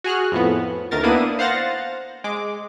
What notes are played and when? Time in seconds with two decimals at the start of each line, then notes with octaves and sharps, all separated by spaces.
0.04 F#4 G#4 F6 F#6
0.32 F2 A2 B3
0.91 D2 D#3 A#4 A6
1.03 A#3 B3 D4 E4 D#6 D#7
1.39 C5 F5 F#5 A6 A#6
2.24 G#3 D6